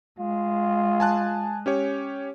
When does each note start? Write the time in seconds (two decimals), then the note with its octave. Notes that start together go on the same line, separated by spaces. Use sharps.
0.19 G#3 F4
1.00 G#5 A5 F#6
1.66 C#4 G4 C#5